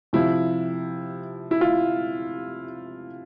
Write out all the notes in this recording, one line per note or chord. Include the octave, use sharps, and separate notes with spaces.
C3 F3 E4
E4
F4